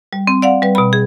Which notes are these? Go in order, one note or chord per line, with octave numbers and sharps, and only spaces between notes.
G3
C4
D5 F5 F#5
G3 B4
B2 B5
G#4